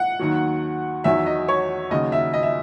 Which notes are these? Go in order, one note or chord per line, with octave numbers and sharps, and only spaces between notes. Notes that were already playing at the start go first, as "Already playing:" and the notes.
Already playing: F#5
D#2 D#3 F#3
E2 D#3 F#3 E5
D#5
C#5
D#2 C#3 F#3 D#5
E5
D#5
E5